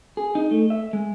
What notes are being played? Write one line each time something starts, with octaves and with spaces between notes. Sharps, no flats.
G#4
D#4
A3
E5
G#3